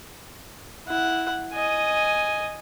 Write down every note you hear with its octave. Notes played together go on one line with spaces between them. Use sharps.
E4 F#5
D#5 G#5